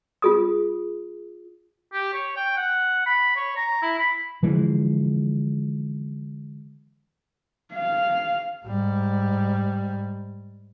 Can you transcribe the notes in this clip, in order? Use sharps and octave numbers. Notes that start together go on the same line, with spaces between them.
F4 G#4 D#6
G4
C#5
G5
F#5
B5
C#5
A#5
E4
B5
D3 E3 F3 G#3
F5
G#2 G3